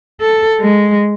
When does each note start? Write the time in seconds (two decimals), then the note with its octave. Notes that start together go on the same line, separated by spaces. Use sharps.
0.21 A4
0.60 G#3